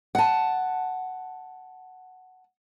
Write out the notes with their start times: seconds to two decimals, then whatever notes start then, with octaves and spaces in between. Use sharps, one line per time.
0.15 F#5 A5